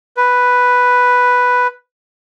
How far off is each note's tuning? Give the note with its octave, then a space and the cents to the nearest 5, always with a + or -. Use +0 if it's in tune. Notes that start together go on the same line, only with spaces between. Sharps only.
B4 +0